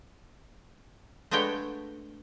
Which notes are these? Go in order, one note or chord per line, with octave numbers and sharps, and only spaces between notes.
G#3 A3 B3 D4 C#5 G5